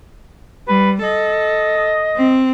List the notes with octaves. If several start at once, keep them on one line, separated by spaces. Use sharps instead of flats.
G3 B4
A4 D#5
C4